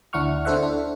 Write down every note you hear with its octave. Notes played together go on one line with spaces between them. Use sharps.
D2 D4 E4 F#5 C#6 F6
D4 E4 A4 C5 E5 F#5
D4